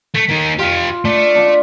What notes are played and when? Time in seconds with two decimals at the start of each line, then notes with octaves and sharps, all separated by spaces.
0.15 A3
0.29 A#3 D#4
0.59 F4 G4 F5
1.05 A3 D4
1.35 D4 F4